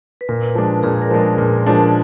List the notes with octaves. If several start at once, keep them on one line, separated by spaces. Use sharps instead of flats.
B4
A#2 A#4
F3 G#3 D4
A#2 G#4
A#4
F3 G#3 D4
A#4
A#2
F3 G#3 D4